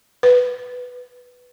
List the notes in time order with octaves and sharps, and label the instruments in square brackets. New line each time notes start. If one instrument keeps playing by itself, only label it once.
[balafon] B4